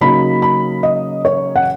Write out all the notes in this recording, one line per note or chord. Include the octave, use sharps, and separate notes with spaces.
C#3 F#3 A#3 D#4 B5
B5
D#5
C#5
F#5